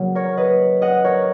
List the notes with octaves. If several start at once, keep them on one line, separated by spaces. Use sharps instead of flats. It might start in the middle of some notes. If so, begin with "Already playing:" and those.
Already playing: C#3 F#3 A#3
A#4 C#5
B4 D#5
D#5 F#5
A#4 C#5